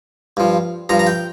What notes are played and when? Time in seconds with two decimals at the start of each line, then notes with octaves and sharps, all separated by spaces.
0.37 G2 F3
0.89 G2 F3 A#5
0.99 A#5
1.07 G5